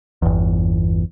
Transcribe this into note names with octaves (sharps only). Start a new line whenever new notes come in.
G1 E2